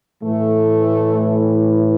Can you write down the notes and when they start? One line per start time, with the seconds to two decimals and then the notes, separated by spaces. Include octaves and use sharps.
0.23 A2 E3 A3